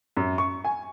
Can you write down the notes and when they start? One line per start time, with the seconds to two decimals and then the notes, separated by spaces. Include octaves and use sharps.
0.17 F#2
0.38 C#6
0.64 G#5